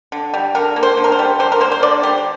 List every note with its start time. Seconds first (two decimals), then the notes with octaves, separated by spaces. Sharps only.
0.12 D3
0.34 G3
0.55 D3 A#4
0.76 A#3
0.83 C5
0.97 D3
1.04 A#4
1.12 C5
1.19 G3
1.39 D3 C5
1.52 A#4
1.60 A#3 C5
1.72 C5
1.83 D3 D5
2.03 G3 C5